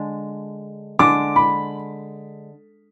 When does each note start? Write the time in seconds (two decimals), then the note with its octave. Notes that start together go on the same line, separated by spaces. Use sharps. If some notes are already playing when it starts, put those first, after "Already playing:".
Already playing: D3 G#3 D4
0.99 D3 G#3 D4 D6
1.36 B5